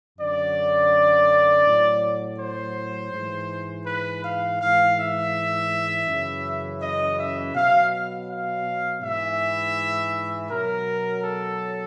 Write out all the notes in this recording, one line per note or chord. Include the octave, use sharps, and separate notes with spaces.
F#2 D3 F#3 D5
A2 F#3
C5
G#2 E3
B4
F5
G#2 E3 F5
E5
F#2 C#3 E3
D#5
E5
B2 F#3 F5
F5
G#2 E3 E5
B2 F#3 A#4
A4